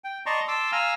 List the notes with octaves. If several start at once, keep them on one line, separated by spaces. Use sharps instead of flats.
G5
D5 D#5 A5 A#5 C6 C#6
A5 C6 D6 E6
F5 G#5 A#5 E6 F6